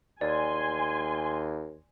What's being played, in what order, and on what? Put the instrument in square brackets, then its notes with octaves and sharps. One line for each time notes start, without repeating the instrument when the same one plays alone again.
[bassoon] D#2 [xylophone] D5 [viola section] G#5 C6